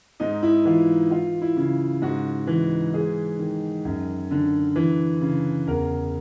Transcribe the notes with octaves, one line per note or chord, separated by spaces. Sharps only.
G#2 D#4
E4
E3 F4
E3 F4
E4
C#3
G#2 F#4
E3
G#2 G#4
D#3
F#2
D3
E3
C#3
E2 A#4